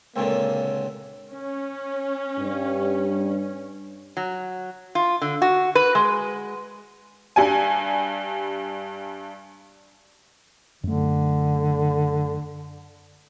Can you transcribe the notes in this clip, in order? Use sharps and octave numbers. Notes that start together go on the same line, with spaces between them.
C#2 A#2 D3 A#3 C4 C#5 G#5
C#4
G2
F#3
F4
D3
F#4
B4
G#3
G2 G3 G#5
F#2 D3 A3